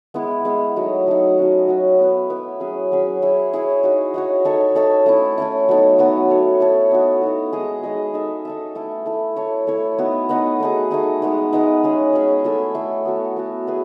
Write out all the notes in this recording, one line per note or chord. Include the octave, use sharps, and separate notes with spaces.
G#3 B3 E4
G#3 B3 E4
F#3 A3 D#4
F#3 A3 D#4
F#3 C#4 F#4
F#3 C#4 F#4
B3 E4 B4
B3 E4 B4
F#3 C#4 G#4
F#3 C#4 G#4
E4 G#4 C#5 E5
E4 G#4 C#5 E5
D#4 F#4 C#5
D#4 F#4 C#5
D#4 A4 C#5 E5
D#4 A4 C#5 E5
A3 C#4 E4
A3 C#4 E4
F#3 B3 D#4 A4
F#3 B3 D#4 A4
E4 A4 C#5
E4 A4 C#5
B3 D#4 F#4
B3 D#4 F#4
G#3 D#4 G#4 D#5
G#3 D#4 G#4 D#5
D#4 A4 E5
D#4 A4 E5
A3 E4 A4
A3 E4 A4
A3 E4 A4 C#5
A3 E4 A4 C#5
B3 D#4 F#4
B3 D#4 F#4
A3 D#4 G#4
A3 D#4 G#4
G#3 B3 D#4
G#3 B3 D#4
G#3 C#4 G#4
G#3 C#4 G#4
A3 E4 A4 E5
A3 E4 A4 E5
B3 F#4 A4
B3 F#4 A4
E4 G#4 B4 E5